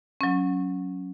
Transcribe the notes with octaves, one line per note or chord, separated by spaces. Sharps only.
F#3 C#4